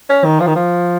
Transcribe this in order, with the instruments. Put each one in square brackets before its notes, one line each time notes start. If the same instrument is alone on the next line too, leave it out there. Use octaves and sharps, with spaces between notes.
[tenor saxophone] C#4
D#3
F3
D#3
F3